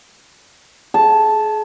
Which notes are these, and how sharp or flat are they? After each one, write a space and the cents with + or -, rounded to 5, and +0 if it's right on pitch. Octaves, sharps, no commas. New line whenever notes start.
G#4 +35 A5 -5